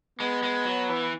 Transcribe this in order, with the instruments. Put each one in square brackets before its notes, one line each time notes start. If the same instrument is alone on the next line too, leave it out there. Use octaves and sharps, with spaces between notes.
[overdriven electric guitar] G#3 [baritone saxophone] B3
[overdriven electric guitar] G#3
F#3
E3